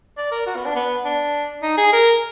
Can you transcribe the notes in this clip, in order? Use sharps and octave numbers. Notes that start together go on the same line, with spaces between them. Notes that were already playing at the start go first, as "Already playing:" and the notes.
D5
A#4
F#4
B3
D4
B3
D4
D#4
G#4
A#4